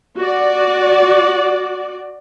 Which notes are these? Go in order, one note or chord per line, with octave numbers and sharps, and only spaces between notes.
F#4 D5